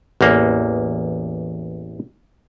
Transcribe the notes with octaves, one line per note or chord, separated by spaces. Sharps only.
A1 E2 A#3